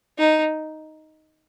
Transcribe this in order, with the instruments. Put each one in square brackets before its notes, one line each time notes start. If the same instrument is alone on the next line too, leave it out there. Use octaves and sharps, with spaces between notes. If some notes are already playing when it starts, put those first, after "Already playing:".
[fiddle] D#4